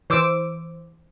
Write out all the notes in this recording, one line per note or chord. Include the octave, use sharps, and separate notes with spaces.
E3 C5 D6 E6 D7